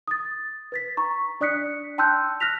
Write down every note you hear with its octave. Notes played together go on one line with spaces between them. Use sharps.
D#6 A6
B4 A6 B6
A#5 C#6
D4 D5 D#6 F#6 B6 C#7
G5 A5 C6 E6 F#6 G6
F6 F#6 A#6 B6 F7